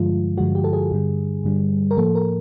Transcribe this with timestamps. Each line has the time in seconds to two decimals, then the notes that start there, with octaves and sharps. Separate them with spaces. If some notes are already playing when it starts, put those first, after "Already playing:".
Already playing: G2 D3 F3 G#3 F4
0.38 G2 D3 F3 G#3 F#4
0.55 G4
0.64 A4
0.73 G#4
0.91 G2 D3 G3
1.44 G2 D3 G3
1.91 A#4
1.97 A2 F3 A#3 A4
2.15 A#4